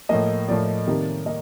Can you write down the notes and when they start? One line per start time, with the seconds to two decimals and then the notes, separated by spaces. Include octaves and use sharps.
0.09 A2 F3 A#3 D#5
0.48 A2 F3 A#3 D5
0.87 C3 D#3 G3 A#3
1.26 A#3 D#5